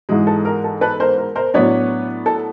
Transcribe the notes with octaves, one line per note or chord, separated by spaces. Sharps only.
G#2 E3 G#3
A4
A#4
A4
A4 B4
A#4 C5
A#4
A#4 C5
A2 F#3 B3 D4 B4 C#5
A4